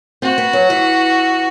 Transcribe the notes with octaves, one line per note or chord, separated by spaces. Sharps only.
C4 F#4
B3
F#3
E3